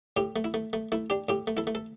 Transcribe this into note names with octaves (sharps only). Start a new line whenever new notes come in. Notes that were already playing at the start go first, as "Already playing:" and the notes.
A2 G4
A3
E4
A3
A3
A3 E4
D4 G4
A2 G4
A3
E4 A4
A3
A4